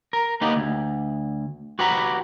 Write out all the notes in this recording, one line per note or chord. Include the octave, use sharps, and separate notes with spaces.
A#4
A#3 B3 D#4 G4
D2
F#4 G4 B4 F#5 A#5 B5